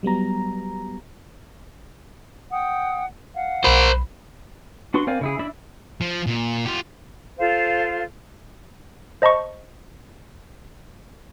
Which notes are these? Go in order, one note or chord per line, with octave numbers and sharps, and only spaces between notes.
F#3 G3 B3 A#5
F#5 G5 D#6
F5 F#5
B1 A#4 C5 B5
D4 F#4 B4 C6 C#6
C4 A#4 D5 F5 G#5
C#3 E4 G#4
D4 E4 D5 E5 B5
F3
A#2
F4 G4
F4 A4 C5 F5
C5 D#5 A5 B5 C#6